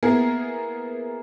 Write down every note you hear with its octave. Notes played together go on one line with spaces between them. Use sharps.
A#3 B3 E4 G#4 A#4